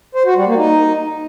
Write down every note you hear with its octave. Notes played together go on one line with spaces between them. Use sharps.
C5
F#4
G3
A#3
D#4